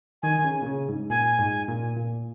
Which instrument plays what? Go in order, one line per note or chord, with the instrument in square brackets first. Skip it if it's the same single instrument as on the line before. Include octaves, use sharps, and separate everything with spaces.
[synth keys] D#3 [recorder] G#5
[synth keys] D#3
C#3
A#2
C#3
G#2
G#2
[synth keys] A#2 [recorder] G#5
[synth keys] G#2
A#2
A#2